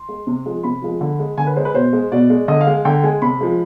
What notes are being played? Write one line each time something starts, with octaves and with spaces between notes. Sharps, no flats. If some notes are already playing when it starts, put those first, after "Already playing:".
Already playing: C6
G#3
C3
F3 G#3
C3 B5
F3 G#3
D3
G#3
D3 G#5
B4
G#3 C5
B4
B2 C5
G#3
B2 D5
G#3
D3 D#5
F5
G#3
D3 G5
G#3 G#5
C3 B5
F3 G#3